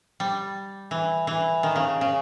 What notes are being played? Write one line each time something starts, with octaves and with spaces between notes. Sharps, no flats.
G3
E3
E3
D#3
C#3
C#3